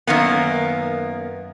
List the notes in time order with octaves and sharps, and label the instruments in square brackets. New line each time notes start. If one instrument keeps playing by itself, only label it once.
[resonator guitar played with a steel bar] F#2 D#3 A#3 B3